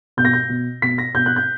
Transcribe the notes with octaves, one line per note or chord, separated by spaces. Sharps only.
B2 G6
A#6
G6
B2
B2 B6
A#6
B2 G6
F#6
G6